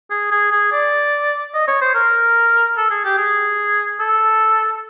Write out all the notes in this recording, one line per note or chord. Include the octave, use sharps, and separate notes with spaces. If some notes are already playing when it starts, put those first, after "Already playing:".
G#4
G#4
G#4
D5
D#5
C#5
C5
A#4
A4
G#4
G4
G#4
A4